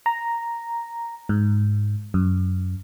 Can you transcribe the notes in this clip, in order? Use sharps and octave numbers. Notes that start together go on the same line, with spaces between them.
A#5
G#2
F#2